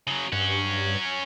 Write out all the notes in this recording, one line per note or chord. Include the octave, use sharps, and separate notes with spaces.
C#3 F#3
G2 C#4 F#4